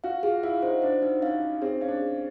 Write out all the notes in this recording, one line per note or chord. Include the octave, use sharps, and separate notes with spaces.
F#4 F5
F4 G#4
E4 F5
D#4 C5
D4 C5
D#4
C#4 F5
D#4
C4 G#4
C#4 F5
D4
G#4